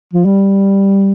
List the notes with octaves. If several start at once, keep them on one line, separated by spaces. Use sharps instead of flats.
F3
G3